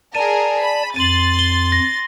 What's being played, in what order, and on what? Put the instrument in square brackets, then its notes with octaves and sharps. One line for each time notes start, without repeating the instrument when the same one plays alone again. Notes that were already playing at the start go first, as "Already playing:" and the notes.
[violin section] G#4 A#4 [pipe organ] D5 A5 [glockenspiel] D#7
[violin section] B5
[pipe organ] F2 [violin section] C6 A6 [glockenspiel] D#7 F#7
[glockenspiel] G7
A#6